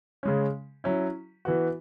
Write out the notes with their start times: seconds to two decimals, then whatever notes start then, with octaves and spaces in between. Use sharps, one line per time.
0.23 C#3 G#3 C#4
0.84 F#3 C#4 E4
1.45 E3 B3 F#4